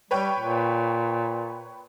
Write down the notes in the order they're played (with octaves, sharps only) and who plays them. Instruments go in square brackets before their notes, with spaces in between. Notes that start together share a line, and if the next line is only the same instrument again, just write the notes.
[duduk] G3 [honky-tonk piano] B4 C#5 G5
[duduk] A#2